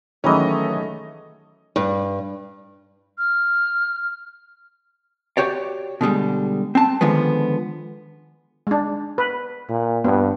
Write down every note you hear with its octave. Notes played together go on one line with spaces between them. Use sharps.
D#3 E3 F#3 G#3 A3 C#4 D#4 D#5
G2
F6
F#4 G4 C#5 D5
B2 D3 G3 G#3
C4 A5
D3 D#3 F3 G#3 B3
G#3 D4
B4
A#2
G2 B3